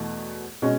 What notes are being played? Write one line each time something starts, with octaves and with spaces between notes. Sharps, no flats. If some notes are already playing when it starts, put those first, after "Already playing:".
Already playing: E2 B2 A3
B2 G#3 C#4